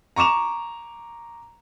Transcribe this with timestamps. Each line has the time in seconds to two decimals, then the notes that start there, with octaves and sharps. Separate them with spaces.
0.16 A#5 C#6 D6 E7 F7